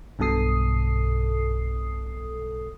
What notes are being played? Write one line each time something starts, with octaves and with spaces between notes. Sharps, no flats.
B1 G2 B2 A4 D#6 C7